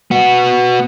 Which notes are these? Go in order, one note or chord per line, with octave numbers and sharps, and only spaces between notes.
B3 F#4